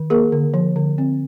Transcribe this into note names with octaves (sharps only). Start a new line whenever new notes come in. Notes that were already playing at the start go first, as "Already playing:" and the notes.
Already playing: D#3
A#3 G#4 A#4
D3
F3
D3
C4